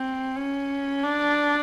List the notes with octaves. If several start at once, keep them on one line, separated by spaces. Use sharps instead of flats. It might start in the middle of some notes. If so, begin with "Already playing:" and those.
Already playing: C4
C#4
D4